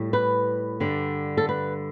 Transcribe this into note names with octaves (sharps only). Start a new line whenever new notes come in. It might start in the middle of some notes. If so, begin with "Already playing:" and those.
Already playing: A2 G3
B4
G2 D3 G3
A4
B4